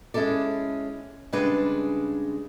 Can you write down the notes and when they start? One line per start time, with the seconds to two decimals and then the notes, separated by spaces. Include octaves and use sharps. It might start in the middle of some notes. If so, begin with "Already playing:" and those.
0.14 G#3 C#4 E4 A4 D5
1.32 C#3 G3 G#3 D4 G#4 B4